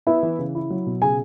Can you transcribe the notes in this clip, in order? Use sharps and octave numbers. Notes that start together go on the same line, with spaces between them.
B3 E4 E5
E3
C#3
E4
F#3
B2
C#3 G#4 G#5